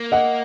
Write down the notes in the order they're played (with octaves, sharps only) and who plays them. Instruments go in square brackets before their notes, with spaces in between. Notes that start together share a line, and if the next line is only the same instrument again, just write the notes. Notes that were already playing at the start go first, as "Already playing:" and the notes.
Already playing: [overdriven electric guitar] A#3
[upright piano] D#5 F#5